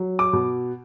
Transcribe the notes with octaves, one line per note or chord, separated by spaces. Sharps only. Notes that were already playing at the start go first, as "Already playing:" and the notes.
Already playing: F#3
D6
B2